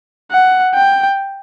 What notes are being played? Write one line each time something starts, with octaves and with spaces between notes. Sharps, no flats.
F#5
G5